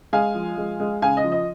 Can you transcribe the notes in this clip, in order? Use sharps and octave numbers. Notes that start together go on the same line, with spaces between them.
G#3 F5 G#5
F3
G#3
G#3
C#3 F5 G#5
D#5
F3
D#5